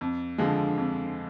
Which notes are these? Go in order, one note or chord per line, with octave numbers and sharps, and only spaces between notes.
F2
D3 F3 G#3
F2